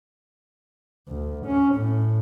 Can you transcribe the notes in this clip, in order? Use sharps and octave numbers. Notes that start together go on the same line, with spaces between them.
D2
C#4
A2